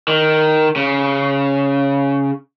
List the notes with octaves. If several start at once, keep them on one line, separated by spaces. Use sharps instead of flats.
D#3
C#3